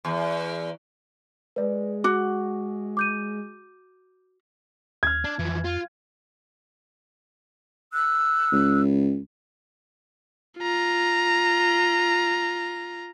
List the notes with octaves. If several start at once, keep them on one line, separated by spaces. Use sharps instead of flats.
E2
G#3 B4 D5
F#4 D6
D6 G6 D#7
D#2 F6 G#6
D4
F2 E3 F3
F4
E6 F#6
C#2
F4 A#5